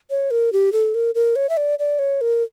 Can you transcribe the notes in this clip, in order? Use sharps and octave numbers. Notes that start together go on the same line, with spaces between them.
C#5
A#4
G4
A4
A#4
A#4
C#5
E5
D5
D5
C#5
A#4